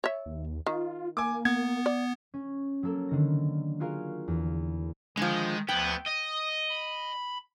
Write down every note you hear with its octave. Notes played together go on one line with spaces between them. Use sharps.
C#5 E5
D#2
D#3 F4
A#3 G#5 D6
B3 G#6
D5
C#4
F#3 A#3 A4 A#4
D3 D#3 A#6
F4 F#4 G#4 A#4 F5
E2
D3 D#3 F3 G#3
D2 F3 B3 G5 G#6
D#5 D#6
B5